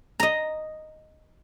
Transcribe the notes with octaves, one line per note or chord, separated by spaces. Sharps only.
D#5 A#5